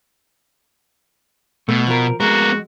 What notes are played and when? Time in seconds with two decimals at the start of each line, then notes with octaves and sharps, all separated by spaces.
1.69 B2 A3
1.87 F3 A#4
2.20 F2 G#3 B3 F#4 A#4